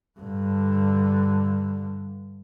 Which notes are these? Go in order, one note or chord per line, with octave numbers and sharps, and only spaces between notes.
G2 D3